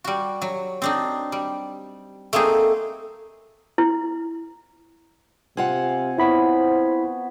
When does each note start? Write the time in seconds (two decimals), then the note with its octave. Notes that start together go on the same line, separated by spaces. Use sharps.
0.04 G3 F#4
0.42 F#3
0.82 C4 D4 D#4
1.32 G3
2.33 A3 A#3 C4 D#4 G#4
3.78 E4
5.57 C3 C4 F4 F#5 G#5
6.18 B3 E4 C5 C#5 B5 B6